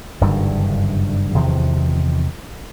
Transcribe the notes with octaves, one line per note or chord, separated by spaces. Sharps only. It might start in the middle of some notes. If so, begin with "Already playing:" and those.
F#1 G2 D3 D#3
E2 C3 D#3 F3